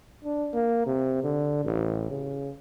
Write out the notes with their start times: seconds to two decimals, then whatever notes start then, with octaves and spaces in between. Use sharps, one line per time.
0.25 D4
0.54 A#3
0.86 C3
1.24 D3
1.65 A1
2.10 C#3